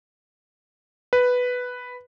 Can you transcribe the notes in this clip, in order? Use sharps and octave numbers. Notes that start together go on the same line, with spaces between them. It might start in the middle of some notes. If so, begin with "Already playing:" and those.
B4